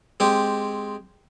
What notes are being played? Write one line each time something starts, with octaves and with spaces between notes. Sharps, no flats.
G#3 C4 G4